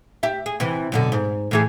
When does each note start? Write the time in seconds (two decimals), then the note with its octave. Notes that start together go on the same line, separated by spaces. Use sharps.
0.23 G4 E5
0.46 G#4
0.60 C3 E3
0.92 F#2 B2 D3
1.12 G#2
1.51 A2 E3 G#4